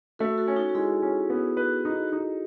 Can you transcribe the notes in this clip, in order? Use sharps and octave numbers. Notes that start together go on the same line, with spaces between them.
A3 F#4 A4
F#4 A4
C#4
D#4 F#4
F#4
G#3 E4 G#4
C#4
B3
B4
D#4
D#4